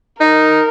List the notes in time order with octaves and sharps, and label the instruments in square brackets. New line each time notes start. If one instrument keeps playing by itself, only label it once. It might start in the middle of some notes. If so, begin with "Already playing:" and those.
[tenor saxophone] D#4 [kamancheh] A#4